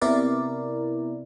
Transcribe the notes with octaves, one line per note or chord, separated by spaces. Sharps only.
C3 B3 E4 A#4 D5